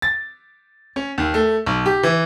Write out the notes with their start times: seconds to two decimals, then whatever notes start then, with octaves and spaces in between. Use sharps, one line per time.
0.02 A6
0.96 C#4
1.18 D#2
1.34 A3
1.66 B1
1.86 G4
2.03 E3